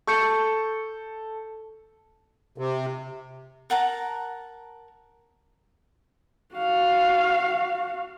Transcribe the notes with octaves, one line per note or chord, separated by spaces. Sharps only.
A4 C#6 G6 C#7
C3
A#4 F#5 A5 A#5
F#4 F5